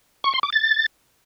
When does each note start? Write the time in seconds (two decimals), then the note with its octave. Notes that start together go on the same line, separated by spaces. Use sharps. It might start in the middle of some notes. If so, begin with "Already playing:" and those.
0.24 C#6
0.34 C6
0.43 D6
0.53 A6